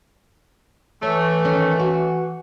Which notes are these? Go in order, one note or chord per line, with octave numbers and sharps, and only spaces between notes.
E3 A3 C#5
D#3 C#4
F#4